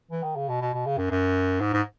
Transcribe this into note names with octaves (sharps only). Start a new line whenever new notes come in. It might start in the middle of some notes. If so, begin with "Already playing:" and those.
E3
D#3
C#3
B2
B2
B2
C#3
F#2
F#2
G#2
G#2